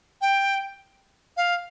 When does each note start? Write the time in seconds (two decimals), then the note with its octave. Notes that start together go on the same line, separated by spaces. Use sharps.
0.22 G5
1.37 F5